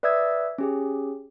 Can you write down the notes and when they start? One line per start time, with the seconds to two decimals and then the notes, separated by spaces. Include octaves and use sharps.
0.03 B4 D5 E5 D#6 E6 G#6
0.58 C#4 G4 G#4